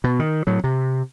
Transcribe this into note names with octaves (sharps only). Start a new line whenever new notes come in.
B2
D#3
A2 F#3
C3